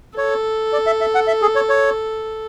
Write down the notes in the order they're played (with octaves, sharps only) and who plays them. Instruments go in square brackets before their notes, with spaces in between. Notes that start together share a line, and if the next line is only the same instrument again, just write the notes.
[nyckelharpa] A4 [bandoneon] C#5
[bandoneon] D5
E5
E5
F#5
E5
G#4
C#5
C#5